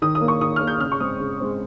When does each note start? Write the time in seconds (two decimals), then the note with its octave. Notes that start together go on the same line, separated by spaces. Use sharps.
0.02 D#3 D#6
0.15 D#6
0.21 A#3
0.28 C#6
0.41 D#3 D#6
0.56 A#3 F6
0.67 G6
0.81 C#3 F6
0.92 C#6
1.00 G#3 C4 D#6
1.20 C#3
1.40 G#3 C4